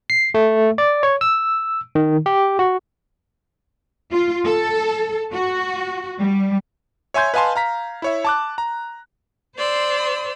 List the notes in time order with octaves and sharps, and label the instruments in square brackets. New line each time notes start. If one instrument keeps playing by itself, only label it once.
[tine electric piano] C7
A3
D5
C#5
E6
D#3
G4
F#4
[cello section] F4
A4
F#4
G3
[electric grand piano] C#5 E5 G#5 C6 G6 G#6
B4 D#5 F5 G#5 A5 C6
F5 A#5 B6
E4 C#5 E5
A5 D6 F#6
A#5
[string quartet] C5 D5 C6 E6